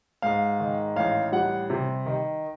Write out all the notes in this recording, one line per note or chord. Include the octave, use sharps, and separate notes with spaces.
G#2 F5
D#3
A1 F5
G3 F#5
C3
D#3